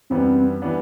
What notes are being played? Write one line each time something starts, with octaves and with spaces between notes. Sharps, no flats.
F#2 E3 G3 B3 C4 D4
E3 G3 B3 D4